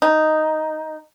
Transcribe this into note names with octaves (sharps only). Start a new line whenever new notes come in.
D#4